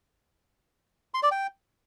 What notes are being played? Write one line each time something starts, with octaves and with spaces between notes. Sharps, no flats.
C6
D5
G5